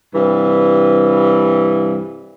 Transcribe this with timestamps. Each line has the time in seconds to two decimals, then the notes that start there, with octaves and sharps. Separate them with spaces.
0.14 G2 C3 E3